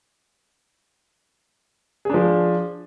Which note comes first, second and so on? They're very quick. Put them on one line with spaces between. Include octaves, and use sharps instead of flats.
G#4 D4 F3